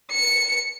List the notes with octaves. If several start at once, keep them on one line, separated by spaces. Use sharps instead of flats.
C#7